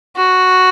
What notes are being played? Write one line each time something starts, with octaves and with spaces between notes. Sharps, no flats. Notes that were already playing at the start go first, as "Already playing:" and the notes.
F#4